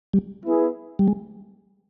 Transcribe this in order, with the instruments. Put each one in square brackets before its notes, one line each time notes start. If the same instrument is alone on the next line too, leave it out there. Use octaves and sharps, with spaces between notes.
[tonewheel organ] G3
[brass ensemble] B3 E4 G#4
[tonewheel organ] G3
G#3